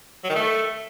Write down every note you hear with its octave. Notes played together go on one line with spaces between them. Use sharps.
F#3
D#3
A3